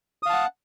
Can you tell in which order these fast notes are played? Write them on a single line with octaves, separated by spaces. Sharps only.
D#6 F5 A5 F#5